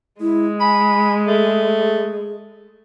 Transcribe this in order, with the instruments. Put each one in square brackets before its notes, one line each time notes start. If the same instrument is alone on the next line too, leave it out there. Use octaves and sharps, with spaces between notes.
[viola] G#3 [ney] E4
[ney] G#5 [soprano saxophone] B5
[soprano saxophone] A3 [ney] G#4